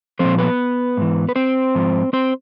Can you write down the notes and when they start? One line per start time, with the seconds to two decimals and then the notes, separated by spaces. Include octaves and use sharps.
0.19 A#2 F3 C4 C5
0.38 B3 B4
0.97 G#2 E3
1.29 B4
1.36 C4 C5
1.75 G#2 F3
2.13 C4 C5